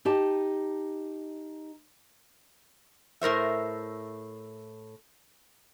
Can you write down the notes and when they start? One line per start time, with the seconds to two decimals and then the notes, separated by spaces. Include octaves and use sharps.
0.05 D#4 G4 D#5 A5
3.21 A2 A#4 C5 E5